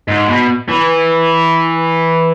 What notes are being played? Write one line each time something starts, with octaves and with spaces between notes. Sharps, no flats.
G#2
B2
E3